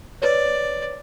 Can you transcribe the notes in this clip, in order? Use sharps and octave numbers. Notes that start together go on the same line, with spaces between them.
B4 C#5 D5